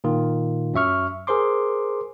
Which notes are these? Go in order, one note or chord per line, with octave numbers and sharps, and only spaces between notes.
A#2 D#3 F4
F#2 F#3 E5 C#6 F6
G#4 A#4 C5 C6 D6